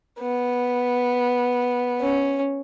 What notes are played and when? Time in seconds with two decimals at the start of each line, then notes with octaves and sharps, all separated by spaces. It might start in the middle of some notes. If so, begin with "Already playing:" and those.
0.20 B3
2.01 C#4